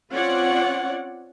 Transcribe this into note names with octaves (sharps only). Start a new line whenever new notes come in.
C4 C#4 F4 C#5 D5 F#5